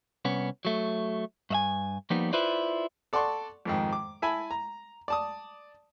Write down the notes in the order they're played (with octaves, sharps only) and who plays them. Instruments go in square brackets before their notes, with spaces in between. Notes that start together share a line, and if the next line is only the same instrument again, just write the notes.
[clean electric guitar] C2 B3 C#4
F#3 A3
G2 E5 G#5
F3 G3 A#3 B3 D#4
E4 F4 B4 C5 D5
[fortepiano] A4 D5 F#5 A5 C6 C#6
F2 G#2 D#3
D6
E4 E5 G#5 A5 B5
A#5
D5 A5 D#6